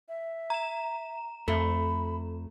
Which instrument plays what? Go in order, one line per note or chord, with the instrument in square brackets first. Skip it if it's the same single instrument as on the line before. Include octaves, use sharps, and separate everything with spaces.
[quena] E5
[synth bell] A#5 E7
[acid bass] F2 [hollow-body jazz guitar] A3 [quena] B5